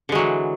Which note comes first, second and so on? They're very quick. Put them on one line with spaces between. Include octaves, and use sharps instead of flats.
D3 G#3 F#3 E3